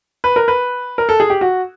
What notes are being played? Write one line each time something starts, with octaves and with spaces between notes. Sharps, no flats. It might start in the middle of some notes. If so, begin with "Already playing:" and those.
B4
A#4
B4
A#4
A4
G#4
G4
F#4